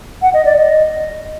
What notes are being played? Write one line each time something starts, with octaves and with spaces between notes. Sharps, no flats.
F#5
D#5
D5
D#5